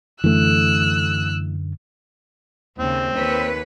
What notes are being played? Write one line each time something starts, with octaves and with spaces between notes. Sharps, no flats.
F#2 D3 E3 A3 E6 F#6
D#2 C#3 C4
D#2 B4 C#5